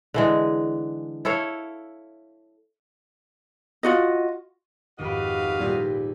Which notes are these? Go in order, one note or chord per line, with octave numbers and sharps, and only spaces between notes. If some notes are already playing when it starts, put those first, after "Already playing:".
D3 E3 G#3
E4 A4 C#5 F5
F4 F#4 D#5
G#1 F2 F#4 G4 B4 D#5 F5 B6
D#1 A#2 G3 D#4 E6